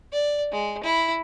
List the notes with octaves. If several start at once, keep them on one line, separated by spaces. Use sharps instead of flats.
D5
G#3
E4